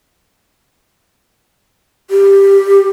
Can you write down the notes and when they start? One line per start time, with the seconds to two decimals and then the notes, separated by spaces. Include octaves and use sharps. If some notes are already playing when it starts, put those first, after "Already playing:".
2.11 G4